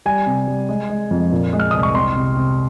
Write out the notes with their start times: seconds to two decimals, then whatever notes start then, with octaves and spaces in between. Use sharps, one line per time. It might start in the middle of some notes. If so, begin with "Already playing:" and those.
0.06 G3 G#5
0.26 C3
0.48 G3
0.69 G#3
0.90 G#3
1.11 F2
1.32 A#2
1.53 G#3
1.60 F6
1.71 C2 D#6
1.83 C#6
1.95 C4 C6
2.15 C3
2.37 C3